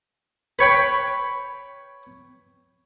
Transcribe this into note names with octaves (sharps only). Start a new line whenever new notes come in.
B4 C#5 G5 B5